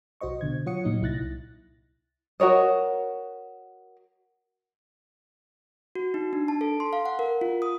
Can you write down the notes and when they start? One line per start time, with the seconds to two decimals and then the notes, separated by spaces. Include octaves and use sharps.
0.21 B1 F#4 C5 D#5 C#6
0.41 B2 D3 G#6
0.66 F#3 F4 C#5 F#5 D#6 C#7
0.85 A#2 F#3 D#4
1.02 C2 E4 F#6 A6 A#6
2.40 F#4 A#4 C#5 D#5
5.95 F#4
6.14 D#4
6.33 D4
6.48 A5
6.61 A4
6.80 C6
6.93 F5
7.06 F#5
7.19 A#4
7.41 F4
7.62 D#6